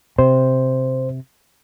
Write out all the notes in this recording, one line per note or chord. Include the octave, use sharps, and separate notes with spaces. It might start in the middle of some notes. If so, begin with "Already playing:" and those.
C3 C5